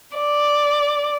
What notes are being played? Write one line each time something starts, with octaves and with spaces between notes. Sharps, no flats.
D5